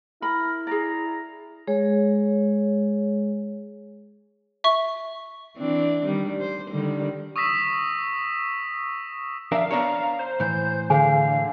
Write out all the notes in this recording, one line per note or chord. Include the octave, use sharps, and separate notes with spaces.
E4 A#4 B5
G#4 D5 A#5
G#3 G#4 C#5
E5 C#6
E3 C4 D4
D#3 G3
C5
D3 D#3 G3
C#6 D#6 E6 A#6 B6 E7
F3 D4 A#4 E5 F5
B3 D4 C#5 A#5
C5
A2 E3 G6
D3 G#4 C5 F5 G#5